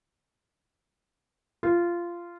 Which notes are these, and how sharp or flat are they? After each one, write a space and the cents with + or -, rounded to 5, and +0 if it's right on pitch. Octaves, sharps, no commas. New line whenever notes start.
F4 -15